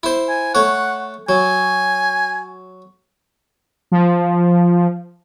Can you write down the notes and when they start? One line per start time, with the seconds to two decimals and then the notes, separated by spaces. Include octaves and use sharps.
0.03 E4 C5
0.29 G#5
0.55 A3 C#5 F#5
1.29 F#3 G#5
3.92 F3